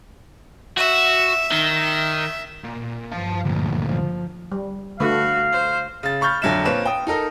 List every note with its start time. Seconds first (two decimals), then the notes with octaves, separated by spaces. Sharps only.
0.78 F#4 E5
1.52 D#3 E5
2.64 A#2
3.12 G2 F3 F5 A5
3.45 D2 A#2
3.83 F3
4.52 G3
5.00 D3 A3 F#4 B4 F5
5.52 C5
6.03 C#3 A6
6.21 B5 C#6 F6 G6 A6
6.42 F2 D3 F#3 E5 E7
6.65 A#2 C4 B4 C#5 E7
6.85 G5 D#6
7.07 D#4 A4 A#4 D#5